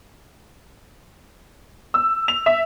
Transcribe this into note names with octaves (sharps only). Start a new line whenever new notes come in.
E6
F7
E5